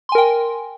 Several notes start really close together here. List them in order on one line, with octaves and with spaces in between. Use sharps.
C6 G#5 A#4 G5